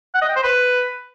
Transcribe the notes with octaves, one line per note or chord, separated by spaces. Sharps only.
F#5
D#5
G5
C5
B4